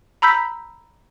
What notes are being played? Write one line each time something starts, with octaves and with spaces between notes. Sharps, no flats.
A#5 B5 E6 G6 B6